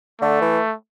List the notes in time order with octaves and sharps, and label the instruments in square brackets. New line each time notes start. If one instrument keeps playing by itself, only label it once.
[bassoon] D3 [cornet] A3
[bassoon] E3